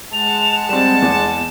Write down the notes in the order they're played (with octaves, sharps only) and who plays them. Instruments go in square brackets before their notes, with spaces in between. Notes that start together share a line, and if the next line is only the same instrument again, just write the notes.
[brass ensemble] G#3 F#5 A5 [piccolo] F7
[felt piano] G3 C4 [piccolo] E7
[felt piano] E2